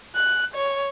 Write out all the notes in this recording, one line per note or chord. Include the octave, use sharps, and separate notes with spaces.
F#6
C#5